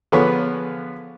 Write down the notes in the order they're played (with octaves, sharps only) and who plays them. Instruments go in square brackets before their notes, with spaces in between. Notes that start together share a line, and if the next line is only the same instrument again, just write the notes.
[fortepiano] D3 F3 B3 G#4 B4 C#5